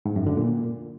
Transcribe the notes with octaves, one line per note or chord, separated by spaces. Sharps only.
G#2
F#2
D3
A#2